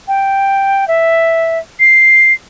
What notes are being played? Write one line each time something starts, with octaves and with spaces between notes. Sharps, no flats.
G5
E5
C7